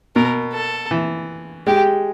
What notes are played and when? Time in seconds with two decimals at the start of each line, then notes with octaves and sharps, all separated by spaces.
0.16 B2 A#4
0.54 A4
0.91 E3
1.67 G#3 G4